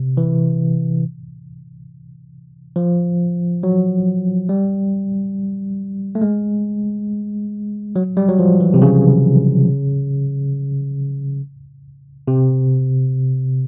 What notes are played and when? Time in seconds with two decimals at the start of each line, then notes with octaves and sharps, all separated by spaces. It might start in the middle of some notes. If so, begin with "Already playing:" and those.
Already playing: C3
0.17 E3
2.76 F3
3.63 F#3
4.49 G3
6.15 A3
6.22 G#3
7.96 F#3
8.17 G3
8.29 F#3
8.39 F3
8.60 E3
8.74 C3
8.82 C#3
12.28 C3